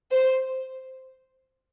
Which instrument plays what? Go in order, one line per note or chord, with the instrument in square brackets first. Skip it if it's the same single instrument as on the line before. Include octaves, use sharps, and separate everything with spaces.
[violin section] C5